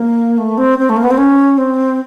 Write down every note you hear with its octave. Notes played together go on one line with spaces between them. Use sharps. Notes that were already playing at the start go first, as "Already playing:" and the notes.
Already playing: A#3
A3
C4
C4
A3
A#3
B3
C4
C#4
C4